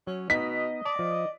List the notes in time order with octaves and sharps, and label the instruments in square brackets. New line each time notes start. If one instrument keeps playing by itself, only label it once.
[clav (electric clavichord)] F#3 [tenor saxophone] C#4
[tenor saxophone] B2 [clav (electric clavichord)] B3 D#4 [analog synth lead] D#5 [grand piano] B6
[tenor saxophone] D5 [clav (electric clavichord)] A5
[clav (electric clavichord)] F3